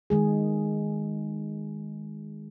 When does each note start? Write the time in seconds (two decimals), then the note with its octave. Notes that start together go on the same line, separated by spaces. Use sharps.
0.10 D#3 G#3 G#4